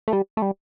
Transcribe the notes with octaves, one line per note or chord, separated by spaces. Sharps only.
A3
G3
A3
G3